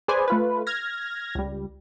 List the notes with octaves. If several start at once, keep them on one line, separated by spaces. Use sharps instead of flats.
G#4 B4 C5 D5 G#5
A3 F4 B4
F6 G#6 A#6
C#2 G3